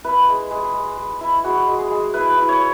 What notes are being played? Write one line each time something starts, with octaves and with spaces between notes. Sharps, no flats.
E4 B4
G#3
G#3
G#3
G#3
E4
G#3 F#4
G#3
G#4
G#3
E4 B4
E4
C#5